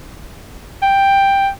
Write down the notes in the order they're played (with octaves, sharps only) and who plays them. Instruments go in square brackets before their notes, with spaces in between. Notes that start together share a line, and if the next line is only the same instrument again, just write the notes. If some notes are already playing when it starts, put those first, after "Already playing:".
[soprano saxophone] G5